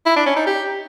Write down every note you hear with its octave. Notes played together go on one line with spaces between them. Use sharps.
E4
D4
C#4
D#4
G4